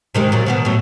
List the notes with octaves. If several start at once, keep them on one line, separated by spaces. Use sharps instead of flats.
C3 D#3 G#3
A#2 F#3
B2 D#3 B3
A2 F#3